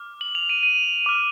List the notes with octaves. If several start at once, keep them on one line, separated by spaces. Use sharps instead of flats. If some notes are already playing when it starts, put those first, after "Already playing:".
Already playing: D6 F6
F#7
F7
D#7
D#7
D6 F6